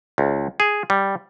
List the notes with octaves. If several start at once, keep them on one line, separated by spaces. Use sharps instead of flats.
C#2
G#4
G3